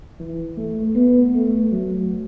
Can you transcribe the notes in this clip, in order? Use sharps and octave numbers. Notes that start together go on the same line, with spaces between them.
E3
A3
B3
A3
F#3